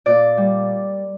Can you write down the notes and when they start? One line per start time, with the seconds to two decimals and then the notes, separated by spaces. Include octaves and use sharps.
0.06 A#2 D5
0.37 G3